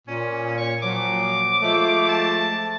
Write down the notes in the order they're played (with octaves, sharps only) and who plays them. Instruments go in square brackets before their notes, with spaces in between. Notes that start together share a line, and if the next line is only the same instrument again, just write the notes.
[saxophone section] A#2 [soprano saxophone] C#4
[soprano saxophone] C#5
[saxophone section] A#2 F3 F#3 [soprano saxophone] D6
[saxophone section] F3 G#3 A3
[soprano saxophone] A5